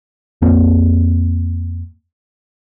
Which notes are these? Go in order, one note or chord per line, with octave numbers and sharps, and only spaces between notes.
F2 A#3 C4